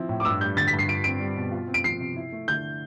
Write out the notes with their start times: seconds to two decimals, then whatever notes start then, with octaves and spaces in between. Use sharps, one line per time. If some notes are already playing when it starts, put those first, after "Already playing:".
Already playing: F3 C4 E4
0.09 A2
0.20 D6
0.25 G2 E6
0.41 G3 G6
0.57 D3 A6
0.67 B6
0.73 G2
0.79 C7
0.88 F4 D7
1.04 C4 D7
1.20 G3
1.36 B2
1.52 F4
1.68 C4
1.74 D7
1.84 F3 C7
2.00 C3
2.16 E4
2.32 A3
2.48 D3 G6